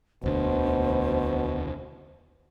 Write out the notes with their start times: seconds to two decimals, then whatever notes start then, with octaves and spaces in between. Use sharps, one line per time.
0.23 E1 D2 B2 D3 C5